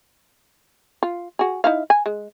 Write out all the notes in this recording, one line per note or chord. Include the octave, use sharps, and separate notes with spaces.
F4
F#4 G#4
D#4 E4 F5
G#5
G#3